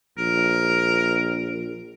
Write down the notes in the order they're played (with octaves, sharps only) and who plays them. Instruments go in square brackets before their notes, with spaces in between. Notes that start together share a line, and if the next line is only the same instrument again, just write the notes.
[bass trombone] A#1 [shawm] A#4